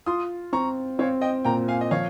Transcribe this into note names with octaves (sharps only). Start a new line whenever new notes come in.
F4 C6 D#6
C4 A#5 C#6
C4 C#5 F5
D#5 G5
A#2 G5 A#5
F5 G#5
D#5
F3 C#5 F5